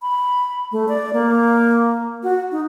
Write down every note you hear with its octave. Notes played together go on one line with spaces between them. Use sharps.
B5
A3
D5
A#3
F#4
D#4